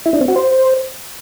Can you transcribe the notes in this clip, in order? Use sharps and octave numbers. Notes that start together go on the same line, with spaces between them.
E4
D4
C4
F#4
C5